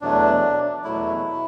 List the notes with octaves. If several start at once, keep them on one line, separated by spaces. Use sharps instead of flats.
E2 B2 F#3 A3 D4
E2 B2 F#3 A3 E4